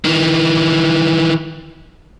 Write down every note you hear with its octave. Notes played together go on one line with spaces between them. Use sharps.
D#3 E3